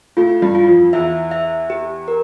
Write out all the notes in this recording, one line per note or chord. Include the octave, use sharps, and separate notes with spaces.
A2 A3 F4
G2 G3
F4
E3
F2 F3
E2 E3 E5
E5
G4
A#4